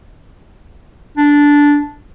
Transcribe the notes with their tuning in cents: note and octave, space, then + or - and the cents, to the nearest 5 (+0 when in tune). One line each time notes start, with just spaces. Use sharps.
D4 -10